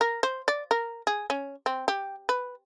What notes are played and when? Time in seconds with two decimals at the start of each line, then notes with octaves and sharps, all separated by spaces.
0.01 A#4
0.23 C5
0.48 D5
0.71 A#4
1.07 G#4
1.30 C#4
1.66 C4
1.88 G4
2.29 B4